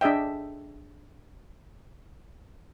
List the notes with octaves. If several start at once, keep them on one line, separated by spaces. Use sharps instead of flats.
D4 G#4 D#5 E5 G5